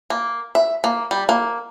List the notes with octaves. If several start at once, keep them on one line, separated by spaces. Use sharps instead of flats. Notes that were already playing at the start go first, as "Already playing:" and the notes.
A#3
E5
A#3
G3
A#3